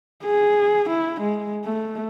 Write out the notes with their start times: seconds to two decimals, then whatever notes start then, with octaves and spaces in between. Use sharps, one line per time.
0.24 G#4
0.90 E4
1.21 G#3
1.65 A3